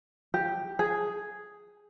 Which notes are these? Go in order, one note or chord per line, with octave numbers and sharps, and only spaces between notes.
G4
G#4